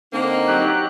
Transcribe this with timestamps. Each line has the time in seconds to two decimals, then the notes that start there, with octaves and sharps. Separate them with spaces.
0.13 D3 A#3 C4 D#4
0.47 F#3 G4 F#6